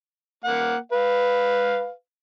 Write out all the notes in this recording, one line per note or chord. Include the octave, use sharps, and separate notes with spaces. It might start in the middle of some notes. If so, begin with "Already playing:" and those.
A#3 F#5
B4 F5